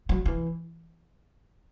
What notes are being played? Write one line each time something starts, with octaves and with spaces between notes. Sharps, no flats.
F#3
E3